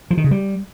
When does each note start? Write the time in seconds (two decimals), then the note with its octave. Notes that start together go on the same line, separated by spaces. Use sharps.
0.11 F3
0.17 D#3
0.24 C#3
0.31 G3